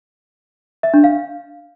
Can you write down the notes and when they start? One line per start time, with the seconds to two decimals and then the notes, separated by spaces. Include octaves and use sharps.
0.83 E5
0.94 D4
1.04 F5